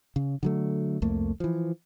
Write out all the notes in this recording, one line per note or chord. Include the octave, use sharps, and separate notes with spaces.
C#3
D3 F#3 A3
C2 F2 A3 A#3
E3 F3